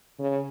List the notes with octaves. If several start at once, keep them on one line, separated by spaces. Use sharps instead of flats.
C#3